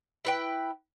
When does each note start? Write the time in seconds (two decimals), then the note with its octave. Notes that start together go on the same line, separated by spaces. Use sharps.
0.25 E4 B4 G5